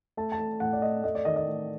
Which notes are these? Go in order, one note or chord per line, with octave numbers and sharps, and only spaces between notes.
A3 A5
A5
A3
A2 F#5
D5
A3 D#5
A3 D#5
D5
D#3 D#5
D#5
A3